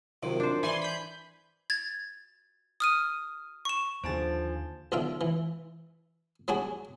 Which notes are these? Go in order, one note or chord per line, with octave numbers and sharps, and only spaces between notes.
F#2 C3 D#3 F3
D4 C5
E3 D4 B4 G#5 C6
B5 G6
G#6 A6
D#6 F6 D#7
C#6 E7
D#2 D3 F3 C5 G#5 A5 A6 D7
B1 D3 D#3 F4 E5 G5
E3
F#3 G3 D4 F#4 G#4